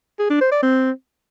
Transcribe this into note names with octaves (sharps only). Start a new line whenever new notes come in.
G#4
D4
C5
D5
C4